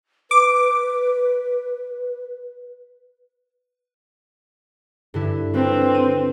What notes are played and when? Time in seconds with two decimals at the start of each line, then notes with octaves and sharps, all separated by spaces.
0.31 B4 D6
5.14 G2 D3 E4
5.54 C4 D4 B4
5.95 D#7